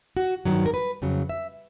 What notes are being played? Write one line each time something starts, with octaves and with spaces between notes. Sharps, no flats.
F#4
G2 D#3 F#3
A#4
B4
F2 C#3 F#3
E5